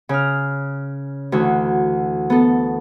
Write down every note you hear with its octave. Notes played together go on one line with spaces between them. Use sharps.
C#3 F6
D2 E3 F#4
B3 A4